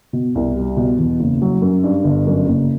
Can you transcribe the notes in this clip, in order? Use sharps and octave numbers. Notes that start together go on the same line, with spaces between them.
B2
C2
G3
B2
E2
F#1
F#3
F#2
G2
G1
F#2
F#1